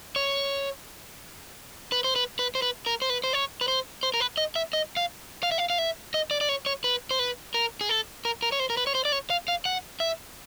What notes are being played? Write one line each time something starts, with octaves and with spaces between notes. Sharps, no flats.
C#5
B4
C5
B4
B4
C5
B4
A#4
C5
B4
C5
C#5
B4
C5
C5
A#4
B4
D#5
E5
D#5
F5
F5
E5
F5
F5
E5
D#5
D5
D5
C#5
C#5
B4
C5
B4
A#4
G#4
A4
A#4
A#4
C#5
C5
A#4
B4
C#5
C5
D5
C#5
F5
F5
F#5
E5